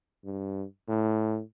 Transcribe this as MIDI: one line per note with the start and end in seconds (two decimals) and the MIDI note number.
0.25 0.65 43
0.89 1.42 45